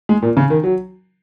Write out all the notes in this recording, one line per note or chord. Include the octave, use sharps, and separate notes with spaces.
G#3
A#2
C#3
D#3
F#3